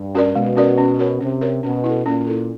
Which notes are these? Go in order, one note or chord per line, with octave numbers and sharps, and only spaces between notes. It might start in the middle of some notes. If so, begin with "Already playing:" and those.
Already playing: G2
C#4 F#4 A#4 D5
B2 G#3
C#4 F#4 A#4 D5
C#4
F#4 A#4 C#5
C3 C#4
F#4 A#4 C#5
B2 C#4
E4 A4
A#2 C#4
E4 A4